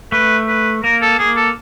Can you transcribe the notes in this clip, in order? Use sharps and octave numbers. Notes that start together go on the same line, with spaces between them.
A3 B4
B4
A#3 A#4
A4
A#3 G#4
A4